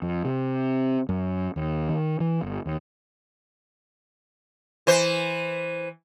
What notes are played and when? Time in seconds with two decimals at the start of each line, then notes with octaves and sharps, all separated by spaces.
0.02 F2
0.25 C3
1.09 F#2
1.56 D#2
1.89 D#3
2.20 E3
2.42 G1
2.66 D#2
4.87 E3 C5